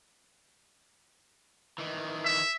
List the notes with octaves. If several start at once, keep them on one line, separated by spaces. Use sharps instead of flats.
D#3 E3
E5